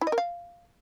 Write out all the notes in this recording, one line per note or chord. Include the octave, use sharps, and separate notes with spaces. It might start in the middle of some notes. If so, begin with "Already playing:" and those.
E4
D#5
A#4
F5